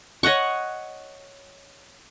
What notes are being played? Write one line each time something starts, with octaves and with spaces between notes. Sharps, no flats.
C#5 D#5 F#5 C#6